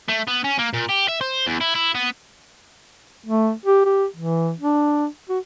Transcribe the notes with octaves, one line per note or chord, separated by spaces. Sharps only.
A3
B3
C#4
A#3
A#2
G4
E5
C5
E2
E4
E4
B3
A3
G4
G4
E3
D4
F#4